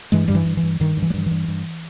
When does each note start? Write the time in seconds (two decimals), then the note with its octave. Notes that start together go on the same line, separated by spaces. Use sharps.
0.12 G2 E3 G#3
0.28 G2 G3
0.35 E3
0.46 G2
0.57 E3
0.63 G2
0.80 G2 D#3
0.97 G2
1.02 E3
1.10 G3
1.14 G2 E3
1.26 G2 E3
1.48 G2